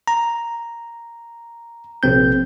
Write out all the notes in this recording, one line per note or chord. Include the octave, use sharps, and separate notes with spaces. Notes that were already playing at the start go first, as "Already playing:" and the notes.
A#5
A#1 C3 C4 G6